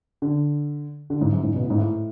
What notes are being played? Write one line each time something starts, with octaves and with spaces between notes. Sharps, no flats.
D3
D3
G#2
F#2
G#2
B2
A2
G#2
A2